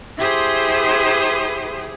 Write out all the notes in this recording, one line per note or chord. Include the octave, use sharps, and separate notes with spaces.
E4 G4 G#4 C5 C6 D#6